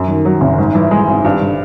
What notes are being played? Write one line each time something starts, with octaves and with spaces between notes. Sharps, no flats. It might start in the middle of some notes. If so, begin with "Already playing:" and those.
Already playing: F#2
D#3
F#3
F#1
G#2
E3
G#3
G#1
G2
D3